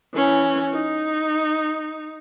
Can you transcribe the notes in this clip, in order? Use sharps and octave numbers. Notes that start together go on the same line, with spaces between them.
E3 C#4
D#4